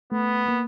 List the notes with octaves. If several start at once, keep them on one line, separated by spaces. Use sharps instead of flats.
A3 B3
A#3